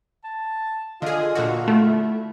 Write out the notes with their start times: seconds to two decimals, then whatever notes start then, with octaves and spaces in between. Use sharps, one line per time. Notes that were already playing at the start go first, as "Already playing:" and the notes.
0.24 A5
1.02 D3 F4 G#4 D#5
1.35 A#2 D3 F#4
1.68 A3 E4